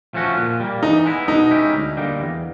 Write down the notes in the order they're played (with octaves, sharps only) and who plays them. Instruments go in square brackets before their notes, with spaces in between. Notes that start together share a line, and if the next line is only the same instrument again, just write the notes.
[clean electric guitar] F3 A3 C#4 F#4
A#2
G3 A#3
[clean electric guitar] E3 [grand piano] D#4
[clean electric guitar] G#3 B3 E4
[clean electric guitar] B2 [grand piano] D#4
[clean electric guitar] G#3 C#4 E4 G4
D2
D3 G3 A#3 D#4
E2